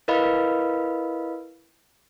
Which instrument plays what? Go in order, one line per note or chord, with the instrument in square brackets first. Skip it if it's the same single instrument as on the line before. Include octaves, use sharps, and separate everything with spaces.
[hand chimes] E4 A#4 B4 D#5 F5 B5